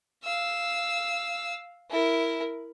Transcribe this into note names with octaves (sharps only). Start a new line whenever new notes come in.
F5 E6
E4 A#4